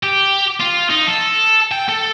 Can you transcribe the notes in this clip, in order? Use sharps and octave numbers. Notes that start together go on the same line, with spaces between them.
G4
F4
D#4
A4
G5
A4